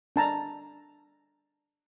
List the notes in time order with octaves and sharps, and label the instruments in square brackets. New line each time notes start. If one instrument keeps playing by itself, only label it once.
[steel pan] D4 A5 A#5